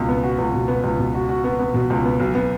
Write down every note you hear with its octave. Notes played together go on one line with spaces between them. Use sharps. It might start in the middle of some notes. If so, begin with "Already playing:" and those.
Already playing: C#2 B2
B3
F#4
C#2
B2
B3
C#2
B2
F#4
F#4
B3
B3
B2
C#2
B3
B1
B3